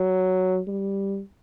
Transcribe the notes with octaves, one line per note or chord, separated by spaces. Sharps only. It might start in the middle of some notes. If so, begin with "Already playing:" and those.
Already playing: F#3
G3